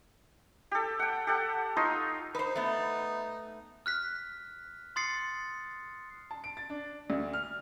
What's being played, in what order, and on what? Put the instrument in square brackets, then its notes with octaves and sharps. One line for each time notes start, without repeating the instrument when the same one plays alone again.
[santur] G4 A4
F#5 G5
G4 A4 F#5
D#4 F4 C#5 C6
[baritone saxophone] D#4 [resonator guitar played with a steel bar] B4 C5
[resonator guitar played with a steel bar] A3 B3
[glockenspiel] F6 F#6 B6
C6 D#6 A6 C7 C#7
[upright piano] A5
D7
A6
D4
D2
F6